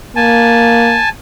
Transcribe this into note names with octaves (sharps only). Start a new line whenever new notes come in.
A#3 G#5 A5